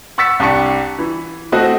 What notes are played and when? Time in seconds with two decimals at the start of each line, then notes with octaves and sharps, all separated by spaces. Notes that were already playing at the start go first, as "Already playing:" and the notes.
0.18 F#5 C#6 E6 A6 B6 C#7
0.40 C2 D4 G4 C#6 C#7
0.99 E3
1.52 A3 C4 F#4 D#5 F#5